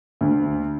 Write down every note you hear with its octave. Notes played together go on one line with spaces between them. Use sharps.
D2